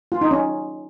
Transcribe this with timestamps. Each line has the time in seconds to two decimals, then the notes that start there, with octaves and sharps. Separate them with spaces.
0.12 F4
0.21 D#4
0.31 C#4